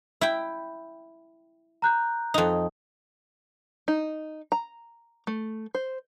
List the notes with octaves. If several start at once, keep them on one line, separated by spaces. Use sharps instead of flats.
E4 G5
A#5 F#6 G6
F2 D#4
D#4
A#5
A3
C5